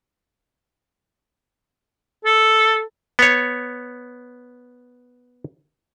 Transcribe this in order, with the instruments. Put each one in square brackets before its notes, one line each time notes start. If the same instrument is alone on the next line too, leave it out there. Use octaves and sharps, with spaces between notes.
[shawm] A4
[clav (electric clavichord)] B3 C#5